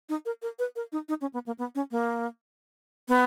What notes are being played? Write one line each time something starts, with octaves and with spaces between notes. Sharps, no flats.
D#4
A#4
A#4
B4
A#4
D#4
D#4
C#4
B3
A#3
B3
C#4
A#3
B3